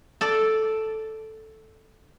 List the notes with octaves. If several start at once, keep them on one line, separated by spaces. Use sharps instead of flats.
A4 D5 A5